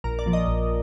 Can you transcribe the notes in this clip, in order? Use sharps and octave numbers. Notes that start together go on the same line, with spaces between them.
A#1 A#4
D5
A#2 F3
D#5
A#1